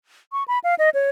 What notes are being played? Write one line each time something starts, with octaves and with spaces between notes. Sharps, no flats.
C#6
B5
F5
D#5
C#5